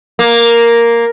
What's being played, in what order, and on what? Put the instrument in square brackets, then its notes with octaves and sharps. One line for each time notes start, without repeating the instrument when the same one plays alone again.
[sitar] A#3